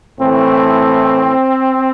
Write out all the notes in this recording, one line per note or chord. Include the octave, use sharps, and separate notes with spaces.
A2 E3 A3 C4